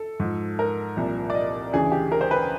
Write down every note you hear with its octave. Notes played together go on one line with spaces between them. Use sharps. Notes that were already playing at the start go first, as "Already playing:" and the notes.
Already playing: A4
G#2 F3
A#4
C2 A#2 F3
D5
D#5
D2 C#3 E3 G#4
G4
A#4
C5
B4